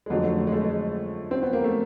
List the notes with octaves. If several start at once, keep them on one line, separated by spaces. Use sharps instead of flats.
G#3
F2 D3 F#3 A3
A3
A3
G#3
A3
G#3
C4
B3
A#3
A3